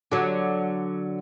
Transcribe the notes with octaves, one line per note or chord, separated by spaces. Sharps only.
D3 F#3